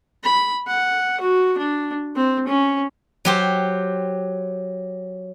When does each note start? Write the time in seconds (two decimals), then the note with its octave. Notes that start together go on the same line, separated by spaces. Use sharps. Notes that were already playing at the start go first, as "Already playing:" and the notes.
0.24 B5
0.67 F#5
1.21 F#4
1.58 D4
2.16 C4
2.48 C#4
3.25 F#3 G4 C5